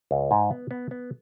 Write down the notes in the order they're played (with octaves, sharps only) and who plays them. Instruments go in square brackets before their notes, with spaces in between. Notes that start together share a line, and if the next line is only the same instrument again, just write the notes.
[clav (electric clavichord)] C#2
G#2
B3
B3
B3